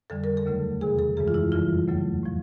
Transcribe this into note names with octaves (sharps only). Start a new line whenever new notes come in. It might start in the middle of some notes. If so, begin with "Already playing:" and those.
F2 D3 G3 A4
A#4
A4
D#2 C#3 F#3 A3
E2 C3 D#3 G#4
A4
F#2 C#3 E3 G#3 G#4
F4
E4
F2 C#3 E3 G3 F4
D#2 C#3 F#3 A3
A2 F3